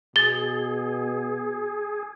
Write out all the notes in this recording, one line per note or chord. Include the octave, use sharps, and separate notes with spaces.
B2 G#4 A6 G7